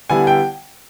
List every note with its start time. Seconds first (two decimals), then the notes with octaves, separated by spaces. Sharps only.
0.10 D3 G3 B3 E4 G#5
0.27 G5